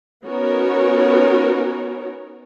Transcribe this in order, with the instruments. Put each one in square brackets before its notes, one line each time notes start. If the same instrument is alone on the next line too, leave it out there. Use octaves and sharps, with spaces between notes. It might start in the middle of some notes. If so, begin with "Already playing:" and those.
[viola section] B3 C#4 D#4 F#4 A#4 C#5